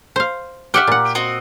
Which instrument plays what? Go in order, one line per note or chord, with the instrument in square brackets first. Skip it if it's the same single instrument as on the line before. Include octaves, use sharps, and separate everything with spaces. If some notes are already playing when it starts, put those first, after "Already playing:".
[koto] C5 F5
[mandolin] G4 F6 [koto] E5 F#5 G5
[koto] A#2 F#5
[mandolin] C4 F#4 D#5